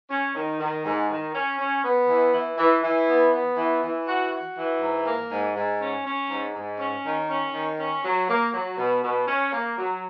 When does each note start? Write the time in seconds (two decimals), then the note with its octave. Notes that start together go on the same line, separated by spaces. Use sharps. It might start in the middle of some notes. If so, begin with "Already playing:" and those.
0.10 C#4
0.35 D#3
0.60 D#3
0.85 G#2
1.10 D#3
1.34 C#4
1.58 C#4
1.84 B3
2.08 E3
2.33 E3
2.58 E3
2.83 E3
3.07 B3
3.32 B3
3.57 E3
3.82 E3
4.06 F#4
4.32 F#4
4.56 E3
4.81 G#2
5.06 A#3
5.30 G#2
5.56 G#2
5.80 C#4
6.05 C#4
6.30 G#2
6.55 G#2
6.79 C#4
7.04 D#3
7.29 C#4
7.54 D#3
7.79 C#4
8.04 F#3
8.29 A#3
8.53 F#3
8.78 B2
9.03 B2
9.27 C#4
9.52 A#3
9.77 F#3